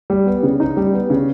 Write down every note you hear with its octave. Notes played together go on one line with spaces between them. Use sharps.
G3
B3
C#3
D#4
G3
B3
C#3